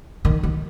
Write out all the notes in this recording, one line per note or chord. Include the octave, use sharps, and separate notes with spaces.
D#3
D#3